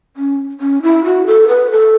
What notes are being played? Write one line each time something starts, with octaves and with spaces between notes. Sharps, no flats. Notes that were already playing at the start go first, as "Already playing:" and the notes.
C#4
C#4
E4
F#4
A4
B4
A4